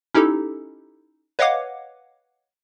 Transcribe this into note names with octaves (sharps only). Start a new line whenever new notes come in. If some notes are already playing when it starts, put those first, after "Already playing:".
C#4 D#4 E4 G4 A4
B4 C#5 D#5 F5 F#5 D6